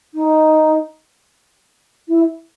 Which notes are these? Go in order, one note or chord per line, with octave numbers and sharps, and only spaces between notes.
D#4
E4